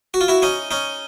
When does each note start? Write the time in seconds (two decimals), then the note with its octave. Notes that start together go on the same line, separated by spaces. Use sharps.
0.14 F#4
0.21 F4
0.28 E4 F#4
0.42 C#4 D#4
0.71 C#4 D#4